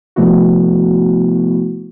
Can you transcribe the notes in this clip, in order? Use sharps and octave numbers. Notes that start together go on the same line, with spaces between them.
C3 F3 A3 B3 E4 F#4